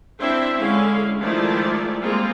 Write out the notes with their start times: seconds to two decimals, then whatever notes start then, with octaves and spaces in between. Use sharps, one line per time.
0.20 C4 D4 E4 C5 E5
0.58 D3 G#3 C#4 E4 F5
1.21 D#3 F3 G#3 A3 E4 D5
2.01 G3 G#3 A#3 C4 F4